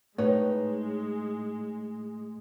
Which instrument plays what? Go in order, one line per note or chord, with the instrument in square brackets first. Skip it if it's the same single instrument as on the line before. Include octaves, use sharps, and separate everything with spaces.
[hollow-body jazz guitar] A2 [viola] G#3 [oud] D#4 B4 C#5